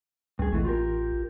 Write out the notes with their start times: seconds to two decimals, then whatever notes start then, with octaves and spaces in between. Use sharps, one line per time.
0.39 D2 G2 G#4
0.52 A1 B2 E3 A3
0.65 F4 G4 A#4